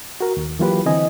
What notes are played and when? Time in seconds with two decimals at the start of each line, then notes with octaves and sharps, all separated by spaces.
0.21 F#4 A#4
0.37 D#2
0.59 E3 F#3 A#3 F4 G4 B4
0.86 D3 E3 C4 D#5 G#5